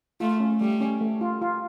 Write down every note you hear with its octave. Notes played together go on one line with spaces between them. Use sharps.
A3 F4
C#4
G3 A3
C#4
A3
F4
F4